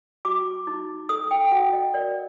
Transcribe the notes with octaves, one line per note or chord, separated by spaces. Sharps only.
F#4 D6
D#4
A4 D#6
G5
F#4 F#5
D#5
A#4 D5